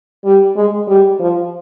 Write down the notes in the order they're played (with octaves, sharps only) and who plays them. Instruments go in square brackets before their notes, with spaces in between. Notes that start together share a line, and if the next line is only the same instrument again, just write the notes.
[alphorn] G3
G#3
G3
F3